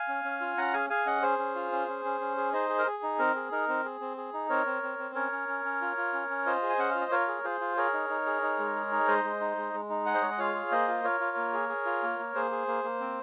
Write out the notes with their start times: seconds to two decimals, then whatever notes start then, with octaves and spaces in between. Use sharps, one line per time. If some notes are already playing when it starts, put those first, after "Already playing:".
Already playing: F5 G#5
0.08 C#4
0.24 C#4
0.41 F4
0.57 C#4 F#5 A#5
0.74 G#4 F5 G#5
0.90 G#4 F5 G#5
1.06 C#4 D#5 F#5
1.22 G#4 C5
1.39 C#4
1.55 F4
1.72 C#4
1.88 C#4
2.05 C#4
2.21 C#4
2.37 G#4
2.53 D#4 C5 D#5
2.69 G#4
2.79 A#4
2.86 G#4
3.03 D#4
3.19 C4 A#4
3.35 G#4
3.52 D#4 A#4
3.68 C4
3.85 G#4
4.00 C4
4.17 G#4
4.33 D#4
4.50 C4 A#4 C#5
4.66 C4
4.83 C4
4.99 C4
5.15 C#4 A#4 C#5
5.32 C#4
5.48 C#4
5.65 C#4
5.81 F4
5.97 F4
6.13 C#4
6.30 C#4
6.46 F4 C5 D#5
6.62 G#4
6.69 G#5
6.78 C#4 F#5
6.91 F4 F5
7.01 D#5
7.11 F4 A#4 C#5
7.28 G#4
7.44 F4 G#4 C5
7.61 F4
7.77 G#4 A#4 C#5
7.93 D#4
8.10 D#4
8.26 G#4
8.42 D#4
8.59 G#3
8.75 G#4
8.91 D#4
9.07 G#3 C5 D#5
9.24 G#3
9.41 D#4
9.57 G#3
9.74 G#3
9.89 D#4
10.06 G#4 D#5 F#5
10.14 C5
10.22 G#3 C#5
10.31 D#5
10.38 F4 C#5 F5
10.55 G#4
10.71 A#3 C5 D#5
10.88 F4
11.04 F4 A#4 C#5
11.20 F4
11.37 A#3
11.53 G#4
11.69 G#4
11.86 F4
12.03 A#3
12.19 A#3
12.35 A#3 G#4 C5
12.51 G#4
12.67 A#3
12.84 A#3
13.01 C4